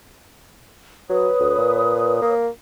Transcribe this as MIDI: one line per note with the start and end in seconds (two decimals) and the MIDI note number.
1.10 1.29 54
1.10 2.33 71
1.10 2.33 73
1.10 2.33 87
1.40 1.56 38
1.58 2.21 46
2.22 2.48 58